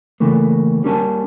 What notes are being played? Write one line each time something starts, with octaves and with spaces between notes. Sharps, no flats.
C#3 E3 A3 A#3
G3 A#3 C#4 A#4 G#5 A5